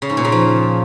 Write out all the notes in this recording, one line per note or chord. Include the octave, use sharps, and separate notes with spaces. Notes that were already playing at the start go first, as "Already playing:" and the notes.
C#3
G#2
A#2
C#3
F3